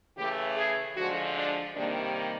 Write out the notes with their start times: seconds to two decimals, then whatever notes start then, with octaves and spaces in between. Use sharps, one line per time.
0.17 C#3 E3 A3 G4
0.57 G#4
0.96 D3 F3 G#3 F#4
1.36 D4
1.76 C3 D#3 G3 A#3 D4